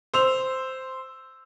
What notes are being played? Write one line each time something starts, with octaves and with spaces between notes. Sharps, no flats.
C5 E6 F7